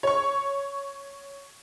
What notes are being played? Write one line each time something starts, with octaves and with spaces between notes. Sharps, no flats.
C#5 C#6